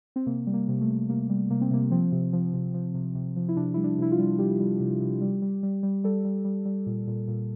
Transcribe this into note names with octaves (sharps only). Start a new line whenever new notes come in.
C4
C3 A#3
G3
A#3
C3
A3
C3
C3 A#3
G3
C3 A#3
C4
C3 A#3
F3 C4
C3
F3
C3
F3
C3
C3
F3
E4
C3 D4
G3 E4
D4
C3 E4
F4
G3
G3 G4
G3
C3
C3
G3
G3
G3
G3
G3 A4
G3
G3
G3
A#2
A#2
A#2